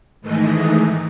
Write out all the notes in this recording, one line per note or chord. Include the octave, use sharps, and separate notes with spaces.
G#2 D#3 E3 G#3 A3 D#4